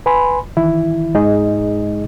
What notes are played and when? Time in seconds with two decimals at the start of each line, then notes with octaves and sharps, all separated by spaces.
0.06 B4 G#5 B5 C6
0.57 D#3 E3 E4
1.14 G#2 G#3 D#4 G#4 D#5